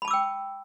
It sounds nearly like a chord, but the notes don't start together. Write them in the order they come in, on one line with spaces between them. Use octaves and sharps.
B5 A5 D6 E6 G5